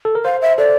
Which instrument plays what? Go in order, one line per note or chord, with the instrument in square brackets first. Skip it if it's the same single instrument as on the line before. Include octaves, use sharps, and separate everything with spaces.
[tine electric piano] A4
A#4
[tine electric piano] C5 [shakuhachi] F5
[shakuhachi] E5
[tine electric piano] A4 [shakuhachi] D5